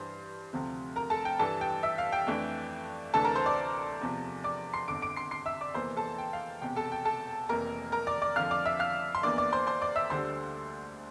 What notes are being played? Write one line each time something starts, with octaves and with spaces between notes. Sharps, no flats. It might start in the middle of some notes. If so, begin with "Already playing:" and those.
Already playing: G2 E3 G3 D4 C5 C6
D2 C3 F3 C4
A#4 A#5
A4 A5
G5
G2 E3 G3 D4 A4 A5
G5
E5 E6
F5
G5
F2 E3 A3 D4
D2 C3 E3 A3 D4 A4 A5
A#4 A#5
C5 C6
D5 D6
E2 C3 F3
D5 D6
C6 C7
G1 F2 D3 D6 D7
D6 D7
C6 C7
C6 C7
E5 E6
D5 D6
F1 E2 E3 A#3 C5 C6
A4 A5
G5
F5
E1 E2 C3 G5
A4 A5
G5
A4 A5
F1 F2 E3 A#3 A#4 A#5
A#4 A#5
D5 D6
D5 D6
F2 D3 F3 F5 F6
D5 D6
E5 E6
F5 F6
C6
E2 E3 A#3 D4 D5 D6
D5 D6
C5 C6
C5 C6
D5 D6
E5 E6
D2 D3 G3 D4 C5 C6